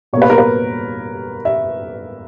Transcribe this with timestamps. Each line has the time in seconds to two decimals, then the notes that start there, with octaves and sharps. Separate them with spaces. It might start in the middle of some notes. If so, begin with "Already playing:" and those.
0.13 B2 C#5
0.17 A#3 B4
0.30 A#4
0.38 B4
1.45 E5